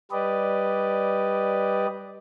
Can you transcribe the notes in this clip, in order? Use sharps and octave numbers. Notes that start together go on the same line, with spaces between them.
G3 G4 B4 D5 D#5